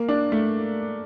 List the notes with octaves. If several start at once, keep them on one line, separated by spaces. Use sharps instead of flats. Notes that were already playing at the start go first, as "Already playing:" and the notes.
Already playing: A#3
D4
A3